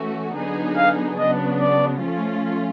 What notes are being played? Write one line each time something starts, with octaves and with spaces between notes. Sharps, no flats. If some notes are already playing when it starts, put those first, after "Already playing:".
Already playing: E3 A3 C#4 F#4
D3 F#3 B3 D#4 G#4
F5
C#3 F#3 B3 D4 D#5
D5
F3 A3 C#4 F4